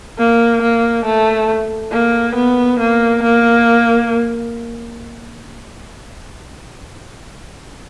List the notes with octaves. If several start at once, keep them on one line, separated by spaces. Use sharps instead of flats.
A#3
A#3
A3
A#3
B3
A#3
A#3